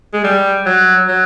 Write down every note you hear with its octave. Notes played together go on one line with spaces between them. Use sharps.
G#3
G3
F#3
F#3